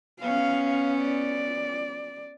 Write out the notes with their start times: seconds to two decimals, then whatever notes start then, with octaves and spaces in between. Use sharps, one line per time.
0.21 B3 C#4 F5
1.02 D5